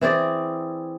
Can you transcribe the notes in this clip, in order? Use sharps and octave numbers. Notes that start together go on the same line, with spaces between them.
E3 C4 G#4 D5